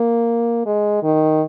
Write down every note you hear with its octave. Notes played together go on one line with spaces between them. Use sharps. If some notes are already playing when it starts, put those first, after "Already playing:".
Already playing: A#3
G#3
D#3